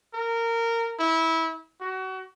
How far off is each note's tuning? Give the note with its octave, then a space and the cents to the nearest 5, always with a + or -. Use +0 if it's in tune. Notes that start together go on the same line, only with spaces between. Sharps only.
A#4 -15
E4 -20
F#4 +30